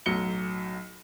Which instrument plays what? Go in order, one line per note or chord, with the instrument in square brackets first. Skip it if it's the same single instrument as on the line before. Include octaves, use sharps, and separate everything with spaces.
[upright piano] B1 A2 F#3 C#7 G7